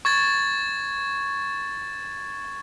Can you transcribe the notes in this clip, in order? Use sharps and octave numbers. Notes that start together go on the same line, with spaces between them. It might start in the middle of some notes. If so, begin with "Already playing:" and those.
C#6 G#6 A6